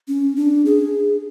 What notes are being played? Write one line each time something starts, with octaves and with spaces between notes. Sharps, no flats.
C#4
D4
G#4